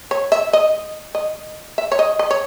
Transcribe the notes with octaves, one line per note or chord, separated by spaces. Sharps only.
C#5
E5
D#5
D#5
E5
C#5
D#5
D#5
C#5